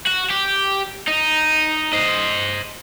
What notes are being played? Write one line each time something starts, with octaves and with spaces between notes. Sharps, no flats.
F#4
G4
D#4
C5 D#5